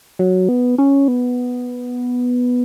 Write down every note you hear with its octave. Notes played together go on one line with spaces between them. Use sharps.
F#3
B3
C#4
B3